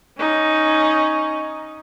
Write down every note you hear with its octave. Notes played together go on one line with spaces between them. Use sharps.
C#4 D#4